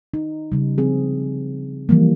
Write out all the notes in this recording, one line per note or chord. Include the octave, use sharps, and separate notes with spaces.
D#4
C#3 G3
F3 C4 G#4
E3 F3 G3 A#3